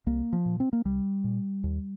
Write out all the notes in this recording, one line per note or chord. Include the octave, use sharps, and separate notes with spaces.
C2 A#3
F3
A#2
C4
A#3
C2 G3
A#2
D#2